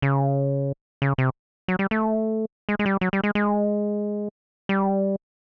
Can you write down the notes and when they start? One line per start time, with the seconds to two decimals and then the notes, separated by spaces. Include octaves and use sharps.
0.02 C#3
1.02 C#3
1.18 C3
1.68 F#3
1.79 G3
1.91 A3
2.69 G#3
2.79 G#3
2.86 G3
3.01 F#3
3.13 G3
3.24 G#3
3.35 G#3
4.69 G3